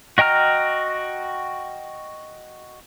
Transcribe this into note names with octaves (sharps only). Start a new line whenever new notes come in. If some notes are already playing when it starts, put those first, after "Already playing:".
F#4 D#5 G5 A#5 F6